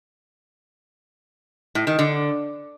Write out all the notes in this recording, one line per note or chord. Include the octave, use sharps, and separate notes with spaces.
A2
D#3
D3